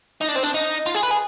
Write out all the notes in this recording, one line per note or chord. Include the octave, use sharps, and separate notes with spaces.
D#4
D4
C4
D4
D#4
F4
G#4
B4
G#4